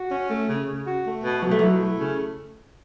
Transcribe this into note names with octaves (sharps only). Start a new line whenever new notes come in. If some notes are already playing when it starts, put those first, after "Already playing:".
Already playing: F#4
C#4
A3
C#3
C#3
F#4
A3
B2
B2 F#3
A3
F#3 E4
A3
C#3